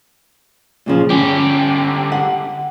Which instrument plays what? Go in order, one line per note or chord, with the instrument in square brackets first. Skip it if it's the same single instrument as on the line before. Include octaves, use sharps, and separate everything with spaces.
[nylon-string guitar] A#2 C#3 F3
[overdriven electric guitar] D3 G4 [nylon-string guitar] C#4
[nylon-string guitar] F#5